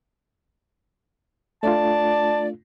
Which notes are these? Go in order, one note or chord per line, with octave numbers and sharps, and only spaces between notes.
A3 D4 F4 D5 A5